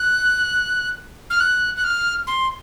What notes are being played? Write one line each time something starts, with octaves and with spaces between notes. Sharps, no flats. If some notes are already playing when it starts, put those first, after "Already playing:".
Already playing: F#6
F6
F#6
F#6
F6
C6